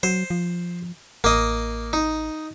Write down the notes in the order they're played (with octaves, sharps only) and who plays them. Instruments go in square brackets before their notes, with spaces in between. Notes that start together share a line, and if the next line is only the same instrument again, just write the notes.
[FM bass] F#3 [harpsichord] C5
[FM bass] F3
[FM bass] A1 [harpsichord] A#3 D#5
[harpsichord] D#4